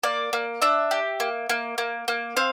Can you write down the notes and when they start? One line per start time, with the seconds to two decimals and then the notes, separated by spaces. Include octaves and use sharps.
0.03 A#3 D5
0.33 A#3
0.62 D4 E5
0.91 G4
1.20 A#3
1.49 A#3
1.78 A#3
2.08 A#3
2.37 C4 F5